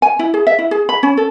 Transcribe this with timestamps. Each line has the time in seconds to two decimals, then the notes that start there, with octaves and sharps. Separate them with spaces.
0.02 G#5
0.19 E4
0.34 G#4
0.47 E5
0.59 E4
0.71 G#4
0.89 B5
1.03 C#4
1.17 A4